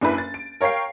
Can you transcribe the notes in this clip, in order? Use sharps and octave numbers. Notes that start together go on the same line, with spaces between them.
F#1 D4 E4 B4
A6
D7
A#4 C#5 F5 G5 C7